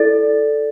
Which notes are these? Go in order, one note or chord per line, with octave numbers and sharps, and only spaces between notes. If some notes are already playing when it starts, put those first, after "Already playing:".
Already playing: E4 A4 D5 A6